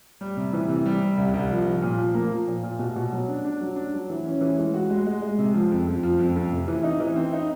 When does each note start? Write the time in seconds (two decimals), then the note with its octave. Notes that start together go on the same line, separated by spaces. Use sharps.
0.21 G3
0.37 C3
0.53 E3
0.69 C3
0.86 G3
1.01 C3
1.17 C2
1.34 C2
1.51 F3
1.66 F3
1.82 A#2
1.99 F3
2.14 A#3
2.32 F3
2.47 A#2
2.63 A#2
2.79 B2
2.96 B2
3.12 F#3
3.28 D4
3.45 D4
3.61 F#3
3.76 D4
3.94 F#3
4.10 E3
4.25 C#4
4.41 E3
4.58 G#3
4.74 F#4
4.90 G#3
5.06 G#3
5.22 G#3
5.39 C3
5.54 F3
5.71 F2
5.87 F2
6.03 F3
6.19 F2
6.36 F2
6.52 C3
6.68 E3
6.83 D#4
7.00 E3
7.16 C4
7.33 D#4